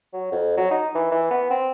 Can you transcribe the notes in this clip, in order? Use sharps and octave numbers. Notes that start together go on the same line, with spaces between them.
F#3
F2
F#3
D#4
E3
E3
B3
C4